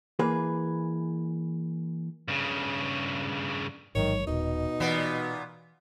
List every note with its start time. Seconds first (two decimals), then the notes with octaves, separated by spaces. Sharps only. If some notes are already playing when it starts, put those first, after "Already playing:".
0.19 E3 A#3 G#4 B4
2.28 G2 C#3
3.95 A1 G#2 D#3 F#3 C#5
4.27 D#1 B2 D#4
4.80 A#2 E3 B3